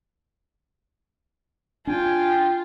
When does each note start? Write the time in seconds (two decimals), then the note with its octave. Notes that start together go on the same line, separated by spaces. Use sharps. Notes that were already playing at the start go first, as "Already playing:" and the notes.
1.87 D4 F4 G5 G#5